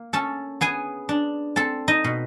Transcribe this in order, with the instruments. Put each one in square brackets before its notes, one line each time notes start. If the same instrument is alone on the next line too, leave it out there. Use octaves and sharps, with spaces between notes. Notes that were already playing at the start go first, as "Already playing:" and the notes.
Already playing: [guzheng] A#3
C#4 A4 A5
B3 G#4 G#5
D4
C4 A4 A5
D#4 D#5
B2